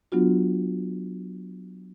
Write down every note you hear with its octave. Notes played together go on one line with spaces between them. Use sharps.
F#3 B3 D4 F4 F#4